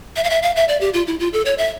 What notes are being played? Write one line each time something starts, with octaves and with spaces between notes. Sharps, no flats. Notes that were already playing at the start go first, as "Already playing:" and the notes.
E5
F5
E5
F5
E5
D5
G4
F4
E4
F4
A4
C#5
E5